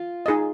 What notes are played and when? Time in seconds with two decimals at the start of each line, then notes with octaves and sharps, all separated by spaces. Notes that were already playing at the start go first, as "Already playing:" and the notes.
Already playing: F4
0.26 D#4 G#4 D#5